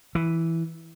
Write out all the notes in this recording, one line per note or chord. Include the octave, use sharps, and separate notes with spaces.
E3